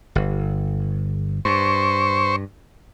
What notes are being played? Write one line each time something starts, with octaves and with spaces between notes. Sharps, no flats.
G1
G2 C5 C#6